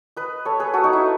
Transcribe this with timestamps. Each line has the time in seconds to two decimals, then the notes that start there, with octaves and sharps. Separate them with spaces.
0.16 B4 D#5
0.45 A4 C#5
0.60 G#4 B4
0.74 F#4 A4
0.84 D#4 F#4
0.93 E4